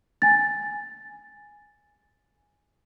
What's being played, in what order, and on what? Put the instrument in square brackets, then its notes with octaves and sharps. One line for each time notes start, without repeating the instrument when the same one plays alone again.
[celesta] G#5 A6